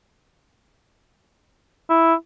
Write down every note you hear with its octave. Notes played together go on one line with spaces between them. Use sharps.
E4